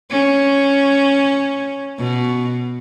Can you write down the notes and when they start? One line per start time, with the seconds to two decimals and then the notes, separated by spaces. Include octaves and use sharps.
0.10 C#4
1.98 B2